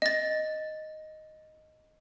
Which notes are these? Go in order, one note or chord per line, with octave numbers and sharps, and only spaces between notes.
D#5 A6